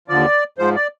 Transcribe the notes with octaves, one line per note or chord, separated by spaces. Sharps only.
D#2 D3 F3 D5
G#2 F3 C5
D5